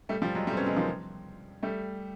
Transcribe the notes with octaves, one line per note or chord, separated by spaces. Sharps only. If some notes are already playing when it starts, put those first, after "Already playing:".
G3 A3
F3 G3
F#3 G#3
G3 A3
C4
B3 C#4
F#3 G#3
D#3 F3
G3 A3